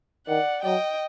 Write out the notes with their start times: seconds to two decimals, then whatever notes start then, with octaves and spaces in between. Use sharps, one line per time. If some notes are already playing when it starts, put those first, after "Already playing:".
0.27 D#3 D5 F#5
0.64 F#3 D#5 G5